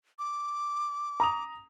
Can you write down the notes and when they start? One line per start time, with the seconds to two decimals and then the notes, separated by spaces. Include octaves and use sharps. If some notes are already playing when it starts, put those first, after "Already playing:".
0.19 D6
1.20 A#5 D#6 F7